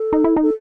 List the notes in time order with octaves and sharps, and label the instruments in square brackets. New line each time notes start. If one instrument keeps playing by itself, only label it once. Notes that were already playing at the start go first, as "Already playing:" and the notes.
Already playing: [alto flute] A4
[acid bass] D#4
E4
D#4
[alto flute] A4